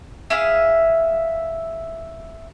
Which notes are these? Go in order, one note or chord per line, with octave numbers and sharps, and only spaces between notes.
E4 G#4 E5 F5